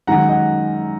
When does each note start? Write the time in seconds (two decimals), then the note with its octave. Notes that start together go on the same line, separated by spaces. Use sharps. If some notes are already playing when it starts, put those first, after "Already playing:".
0.07 F#2 D#3 G#3 F#5 A#5
0.28 D#5 F#5